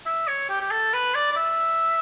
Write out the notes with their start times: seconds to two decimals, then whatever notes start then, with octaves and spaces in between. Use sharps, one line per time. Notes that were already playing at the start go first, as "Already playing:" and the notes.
0.06 E5
0.28 C#5
0.49 G4
0.60 G4
0.71 A4
0.93 B4
1.15 D5
1.31 D5
1.36 E5